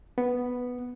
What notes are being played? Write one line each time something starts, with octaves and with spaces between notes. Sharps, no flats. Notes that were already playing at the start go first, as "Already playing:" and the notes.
B3